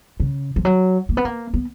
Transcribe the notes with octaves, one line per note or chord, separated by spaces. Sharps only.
C#3
F3
F#3
A#3
B3
A#3
B3